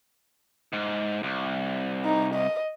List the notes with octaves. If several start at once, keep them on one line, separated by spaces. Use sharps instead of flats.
G#2
C2
D#4
D#5